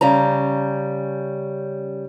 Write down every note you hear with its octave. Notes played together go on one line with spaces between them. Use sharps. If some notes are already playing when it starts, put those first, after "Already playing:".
C#3 G3 C#4 A#5